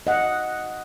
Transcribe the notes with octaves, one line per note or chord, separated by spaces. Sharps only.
D#5 F#5